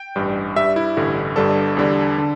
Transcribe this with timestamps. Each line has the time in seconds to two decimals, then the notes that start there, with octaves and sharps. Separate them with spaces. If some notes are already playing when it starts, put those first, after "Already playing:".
Already playing: G5
0.16 A1 G2 G3
0.56 G2 G3 E5
0.76 E4
0.97 A1 G2 D3 G3
1.36 G1 G2 D3 G3 A4
1.77 E2 D3 G3
2.18 D3